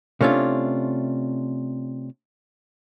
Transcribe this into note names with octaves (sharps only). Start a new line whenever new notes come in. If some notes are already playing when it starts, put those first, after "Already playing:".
C3 A3 C#4 D4 F4